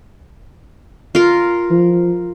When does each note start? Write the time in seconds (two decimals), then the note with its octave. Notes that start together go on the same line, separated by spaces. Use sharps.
1.15 F4 A#4
1.70 F3